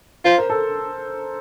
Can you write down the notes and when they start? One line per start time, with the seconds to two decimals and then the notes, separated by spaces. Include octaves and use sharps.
0.25 F4 C5
0.38 A#4
0.50 A4